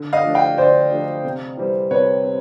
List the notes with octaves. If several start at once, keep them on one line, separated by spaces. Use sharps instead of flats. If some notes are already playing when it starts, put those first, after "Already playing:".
Already playing: D3
D#5 F5
F3 A3 D4
F5 G5
D3 C5 D5
F3 A3 D4
C3
E3 G3 C4
C3 B4 C#5
C4